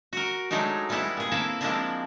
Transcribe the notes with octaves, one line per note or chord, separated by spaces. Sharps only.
F#4 A#4
F#3 G#3 A3 D4 D#4
E3 G3 G#3 B3 E4
A#2 G#4
A#3 C4 E4 A4 B4
F3 G#3 A#3 C4 D4 E4